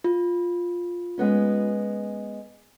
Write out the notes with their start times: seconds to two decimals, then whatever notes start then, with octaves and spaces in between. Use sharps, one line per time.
0.04 F4
1.18 G#3 B3 C#4